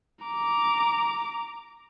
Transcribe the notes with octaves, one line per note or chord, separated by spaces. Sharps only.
A#5 D6